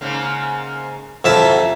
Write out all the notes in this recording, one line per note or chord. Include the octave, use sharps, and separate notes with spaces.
G#2 C#3 A#3
F2 C3 F#3 E4 E5 A5